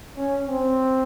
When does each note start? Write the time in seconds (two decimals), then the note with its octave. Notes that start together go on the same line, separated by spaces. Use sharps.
0.17 C#4
0.47 C4